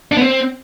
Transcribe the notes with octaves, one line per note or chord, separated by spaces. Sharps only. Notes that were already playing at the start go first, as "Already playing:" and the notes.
D4
B3
C4